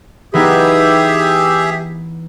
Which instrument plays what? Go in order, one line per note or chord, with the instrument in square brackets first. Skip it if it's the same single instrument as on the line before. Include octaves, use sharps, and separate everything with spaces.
[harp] E3 B3 D#4 [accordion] G4 G#4 E5